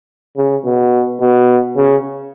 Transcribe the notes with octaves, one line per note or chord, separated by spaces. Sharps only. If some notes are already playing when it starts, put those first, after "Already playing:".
C#3
B2
B2
C#3